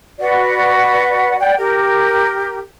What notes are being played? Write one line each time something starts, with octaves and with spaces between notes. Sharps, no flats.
F#4 B4 D5 F#5
D5 F#5 G5
G4 A#4